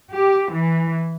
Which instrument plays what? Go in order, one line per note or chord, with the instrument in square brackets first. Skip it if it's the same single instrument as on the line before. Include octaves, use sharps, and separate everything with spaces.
[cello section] G4
E3